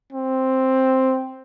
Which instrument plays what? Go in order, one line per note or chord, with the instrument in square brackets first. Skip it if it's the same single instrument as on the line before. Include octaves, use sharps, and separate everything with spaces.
[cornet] C4